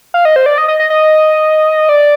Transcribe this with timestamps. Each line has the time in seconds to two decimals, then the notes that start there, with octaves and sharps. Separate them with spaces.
0.14 F5
0.25 D#5
0.36 C5
0.46 D5
0.58 D#5
0.68 D#5
0.80 D#5
0.90 D#5
1.89 D5